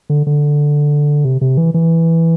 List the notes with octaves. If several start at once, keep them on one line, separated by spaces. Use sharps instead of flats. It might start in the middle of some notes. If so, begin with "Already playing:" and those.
D3
D3
C3
C3
E3
E3